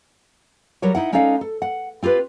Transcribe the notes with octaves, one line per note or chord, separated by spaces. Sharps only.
F#3 G3 A#4 C#5
D#4 E4 F#5
G#3 C#4 D#4 A4 D5 F5
A4
F#5
C4 F4 G4 B4